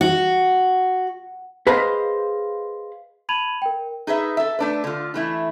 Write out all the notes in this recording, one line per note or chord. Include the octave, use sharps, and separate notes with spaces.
F#4
G#4 B4 C5 D#5 F5
A5 B5 G#6 D#7 F7 F#7
A#4 G5
D#4 G#4 B4 E5
A4 E5
A3 D4 B4
D3 F4
E3 A3 E4